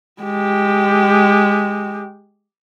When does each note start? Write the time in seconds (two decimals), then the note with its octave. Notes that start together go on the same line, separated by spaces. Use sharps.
0.22 G#3 G4